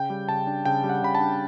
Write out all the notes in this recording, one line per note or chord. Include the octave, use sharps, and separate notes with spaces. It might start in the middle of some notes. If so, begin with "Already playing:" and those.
Already playing: C#3 G5
G3
C#3 A5
D4
C#3 G5
G3
F#5
C#3 B5
A5
D4